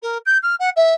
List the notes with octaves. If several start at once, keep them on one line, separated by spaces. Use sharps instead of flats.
A#4
G6
F6
F#5
E5